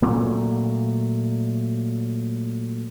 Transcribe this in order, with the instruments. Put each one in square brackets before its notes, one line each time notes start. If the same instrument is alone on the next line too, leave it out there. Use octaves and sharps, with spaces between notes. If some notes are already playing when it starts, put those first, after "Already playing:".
[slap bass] A#2 F#3 A3